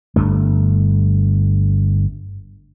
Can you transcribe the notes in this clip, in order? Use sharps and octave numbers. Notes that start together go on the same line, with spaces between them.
G1 G2 A3